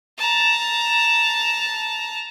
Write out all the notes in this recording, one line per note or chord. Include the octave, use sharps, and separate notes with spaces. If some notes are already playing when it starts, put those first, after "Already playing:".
A5 A#5